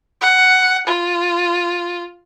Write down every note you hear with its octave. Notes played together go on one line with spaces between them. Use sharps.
F#5
F4